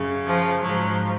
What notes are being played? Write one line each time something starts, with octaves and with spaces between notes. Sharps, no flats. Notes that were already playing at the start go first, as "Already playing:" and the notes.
Already playing: F#2 C#3
F3
G#2 F3 F#3